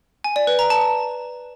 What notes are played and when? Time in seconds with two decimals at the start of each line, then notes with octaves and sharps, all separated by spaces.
0.24 G#5
0.36 D5
0.47 B4
0.59 A#5
0.70 A5